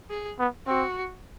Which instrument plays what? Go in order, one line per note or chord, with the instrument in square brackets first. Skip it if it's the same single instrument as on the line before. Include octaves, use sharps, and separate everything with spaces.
[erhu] G#4
[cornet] B3
[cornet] C4 [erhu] F#4